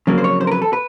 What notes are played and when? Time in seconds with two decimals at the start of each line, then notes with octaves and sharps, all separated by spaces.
0.07 F2 C#3 F#3 A#3
0.18 C5
0.24 C#5
0.41 C5
0.47 A#4
0.51 B4
0.62 A4
0.73 B4